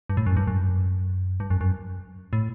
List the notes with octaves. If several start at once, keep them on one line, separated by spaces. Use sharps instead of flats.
G2
A2
F#2
G2
F#2
G2
F#2
F#2
A2